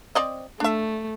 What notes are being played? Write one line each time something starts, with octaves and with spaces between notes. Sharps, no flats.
C4 D5 D#5
A3 D4 E5